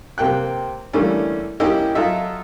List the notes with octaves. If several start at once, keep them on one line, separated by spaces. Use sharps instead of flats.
C3 A#3 G5 F#6
D3 E3 G3 A3 A#3 C#4
A#3 C#4 E4 G4 D#5 G5
F#3 F4 A4 D#5 E5